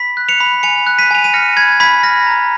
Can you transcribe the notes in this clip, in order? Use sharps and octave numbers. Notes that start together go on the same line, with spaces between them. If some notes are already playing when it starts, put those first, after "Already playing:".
Already playing: B5 B6
F#6
C#7 F7
B5
G#5 C#7 F7
F#6
B6 D#7
G#5 F7
D#7
F6 A#6 C#7
B5 G#6
B5 G#6 B6
F6 A#6
A#5